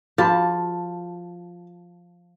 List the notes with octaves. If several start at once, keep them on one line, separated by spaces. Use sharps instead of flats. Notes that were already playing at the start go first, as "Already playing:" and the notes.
F3 F4 F#4 G#4 A5